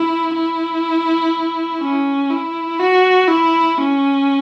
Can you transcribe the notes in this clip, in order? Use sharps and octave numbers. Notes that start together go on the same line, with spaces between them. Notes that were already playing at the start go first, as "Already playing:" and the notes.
Already playing: E4
E4
C#4
E4
F#4
E4
C#4